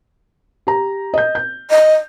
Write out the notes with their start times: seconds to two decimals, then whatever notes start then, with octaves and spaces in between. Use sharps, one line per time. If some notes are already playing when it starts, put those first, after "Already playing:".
0.67 G4 A#5
1.14 D#5 G6
1.35 G6
1.70 D#5